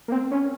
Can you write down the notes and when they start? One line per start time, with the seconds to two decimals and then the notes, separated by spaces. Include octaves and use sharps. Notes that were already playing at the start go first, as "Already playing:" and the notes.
0.08 A#3
0.12 C4
0.31 C#4